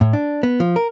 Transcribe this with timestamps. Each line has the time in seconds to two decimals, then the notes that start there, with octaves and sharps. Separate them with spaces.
0.01 A2
0.13 D4
0.43 B3
0.60 F3
0.76 A#4